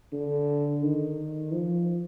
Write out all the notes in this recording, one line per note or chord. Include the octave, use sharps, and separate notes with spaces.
D3
D#3
F3